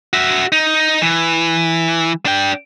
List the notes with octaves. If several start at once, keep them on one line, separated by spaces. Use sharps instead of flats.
F#4 E5
D#4
E3
D4 G5